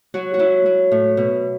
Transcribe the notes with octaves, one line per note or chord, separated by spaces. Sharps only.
F#3 F#4
F#4
F#3 E4
F#3
A2
B2